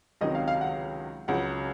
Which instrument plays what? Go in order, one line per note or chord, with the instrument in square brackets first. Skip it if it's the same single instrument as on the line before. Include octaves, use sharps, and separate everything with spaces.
[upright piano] C#2 C3 D#3 F#3 D#5
F5
F5
F#5
C#2 C#3 F#3 F#5